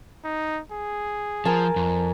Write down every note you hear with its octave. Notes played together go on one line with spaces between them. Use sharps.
D#4
G#4
F3 A#4 G#5 A5
F2